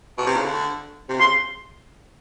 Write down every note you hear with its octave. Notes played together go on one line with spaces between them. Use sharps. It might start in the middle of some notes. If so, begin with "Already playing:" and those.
B2
C3
C#3
D3
C3
C#3 C6